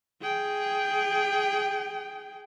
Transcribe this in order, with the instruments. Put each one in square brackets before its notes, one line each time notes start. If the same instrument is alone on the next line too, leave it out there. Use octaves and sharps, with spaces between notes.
[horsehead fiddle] G#4 G5